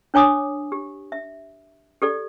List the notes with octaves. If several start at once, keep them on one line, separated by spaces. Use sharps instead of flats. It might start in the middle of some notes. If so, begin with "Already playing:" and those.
D4 C#5 G#5 D6 D#6
G4
E5
G4 A4 D5